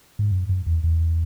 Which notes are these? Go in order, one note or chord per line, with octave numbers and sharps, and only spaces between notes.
G#2
F#2
F#2
E2
E2